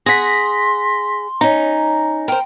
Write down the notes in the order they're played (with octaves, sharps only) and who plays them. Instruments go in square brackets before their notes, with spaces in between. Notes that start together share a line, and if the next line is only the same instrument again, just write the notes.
[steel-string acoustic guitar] G#4 F#5 [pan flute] C6 [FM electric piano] A#6 B6
[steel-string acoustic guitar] C#4 D#4 [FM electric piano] A#5
[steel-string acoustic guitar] A#4 C5 [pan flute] G5